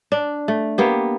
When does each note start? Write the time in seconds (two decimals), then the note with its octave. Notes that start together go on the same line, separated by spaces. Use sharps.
0.12 D4
0.48 A3
0.78 A#3 B3 G4